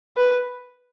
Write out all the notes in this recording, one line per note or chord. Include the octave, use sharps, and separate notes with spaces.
B4